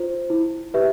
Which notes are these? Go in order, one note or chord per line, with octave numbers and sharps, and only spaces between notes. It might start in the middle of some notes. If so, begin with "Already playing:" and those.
Already playing: F4 C5
E4
G4 B4 E5